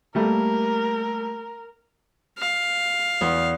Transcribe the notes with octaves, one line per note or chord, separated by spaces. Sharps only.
G3 A3 A#3 A#4
F5
E2